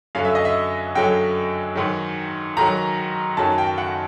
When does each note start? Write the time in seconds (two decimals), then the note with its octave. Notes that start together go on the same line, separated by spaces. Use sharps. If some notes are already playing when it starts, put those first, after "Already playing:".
0.15 F#2 D3 F#3 F5
0.25 E5
0.35 D#5
0.45 E5
0.95 F#2 D3 F#3 G5
1.75 G#2 D#3 F#3
2.57 G#2 D#3 F#3 A#5
3.37 F#2 D#3 F#3 A5
3.58 G5
3.78 F#5